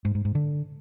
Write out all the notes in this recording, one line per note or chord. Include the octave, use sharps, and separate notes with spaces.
G#2
G#2
G#2
D3